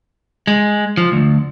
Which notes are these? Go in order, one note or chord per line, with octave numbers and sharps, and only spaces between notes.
G#3
F3
D2